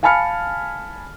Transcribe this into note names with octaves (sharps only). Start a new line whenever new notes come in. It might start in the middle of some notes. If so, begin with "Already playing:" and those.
F5 G#5 A5 B5 F6 C#7